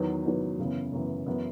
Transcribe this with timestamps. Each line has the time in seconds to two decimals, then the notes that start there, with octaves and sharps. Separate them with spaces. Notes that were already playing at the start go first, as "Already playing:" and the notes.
Already playing: E2 D#3 F#3 B3 D#4
0.25 E2 D#3 F#3 B3 D#4
0.58 F#2 C#3 E3 B3
0.92 F#2 C#3 E3 B3
1.26 F#2 E3 B3